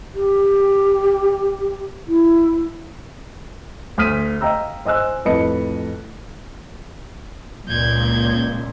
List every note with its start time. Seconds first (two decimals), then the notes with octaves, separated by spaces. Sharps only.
0.15 G4
2.07 E4
3.98 D2 D#6 F6 B6 D#7
4.41 D#5 F5 G5 A#5 E6
4.85 C5 D#5 G#5 E6 F#6
5.25 F2 A2 B4 D#5 A5 C#7
7.68 C#2 A#2 G6 G#6